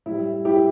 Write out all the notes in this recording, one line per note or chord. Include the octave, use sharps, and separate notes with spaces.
A2 G3 E4
E4 G4